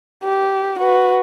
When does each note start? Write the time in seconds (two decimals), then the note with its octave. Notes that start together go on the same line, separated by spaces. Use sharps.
0.24 G4
0.79 F#4 B4